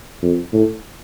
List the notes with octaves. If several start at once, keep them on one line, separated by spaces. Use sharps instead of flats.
F2
A2